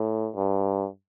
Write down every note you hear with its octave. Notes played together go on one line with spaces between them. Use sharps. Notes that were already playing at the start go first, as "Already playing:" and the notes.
Already playing: A2
G2